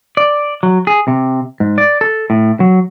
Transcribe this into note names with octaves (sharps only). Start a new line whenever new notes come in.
D5
F#3
G#4
C3
G#2
D5
A4
A2
F#3